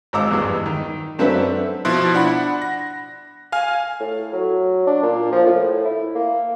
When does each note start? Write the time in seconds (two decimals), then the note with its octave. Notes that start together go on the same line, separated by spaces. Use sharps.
0.13 G#1 G#3 A#5 D6 E6
0.31 E2 G2
0.66 D#3
1.19 F#2 C4 D4 A4 B4 E5
1.85 B2 F3 E4 C6 F#6
2.14 D4 F#5 B5
2.62 A#6
3.52 F5 G#5 F6
4.00 A2
4.33 F#3
4.87 D4
5.03 A#2
5.32 F3
5.46 A2
5.85 E4
6.15 A#3